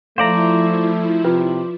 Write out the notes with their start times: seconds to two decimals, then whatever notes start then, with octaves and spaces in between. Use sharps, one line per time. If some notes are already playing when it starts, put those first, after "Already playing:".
0.18 F3 A3 E4 C5 D5 F5 A#5
1.25 C3 F4 B4